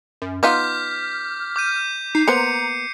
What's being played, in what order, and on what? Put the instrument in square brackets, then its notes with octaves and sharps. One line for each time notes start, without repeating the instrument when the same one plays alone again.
[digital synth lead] F#2
[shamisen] B3 D#4 F4 [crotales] D6 G6 B6 [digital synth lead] F6
[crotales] D6 G6 D#7
[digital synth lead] D#4 [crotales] C7
[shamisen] A#3 B3 C5 [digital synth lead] A#5 [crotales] C#7